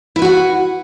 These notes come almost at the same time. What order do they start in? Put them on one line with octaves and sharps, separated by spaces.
E4 B4 F#4 F#5